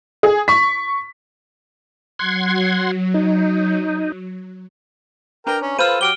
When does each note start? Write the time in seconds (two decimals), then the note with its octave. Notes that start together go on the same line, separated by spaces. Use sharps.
0.23 G#4
0.48 C#6 B6
2.19 F#3 F#5 C6 G#6
3.14 D#4
5.47 D4 A#4 B4 G5 A#5
5.61 C#4
5.79 F4 A4 B4 C5 A#5 B5 F6 D#7
6.01 F#3 G4 F6 D7 G7